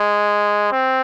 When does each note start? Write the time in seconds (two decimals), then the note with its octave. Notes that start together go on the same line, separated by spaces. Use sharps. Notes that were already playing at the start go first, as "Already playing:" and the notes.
Already playing: G#3
0.73 C4